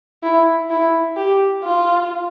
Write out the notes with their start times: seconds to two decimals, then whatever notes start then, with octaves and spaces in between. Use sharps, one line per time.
0.23 E4
0.70 E4
1.17 G4
1.64 F4